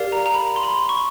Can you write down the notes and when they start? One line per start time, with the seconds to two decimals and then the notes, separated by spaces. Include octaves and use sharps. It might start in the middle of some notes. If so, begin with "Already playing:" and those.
Already playing: G4 A#4 D5 F5
0.12 A#5
0.26 A#5
0.34 B5
0.56 C6
0.63 B5
0.71 C6
0.89 C#6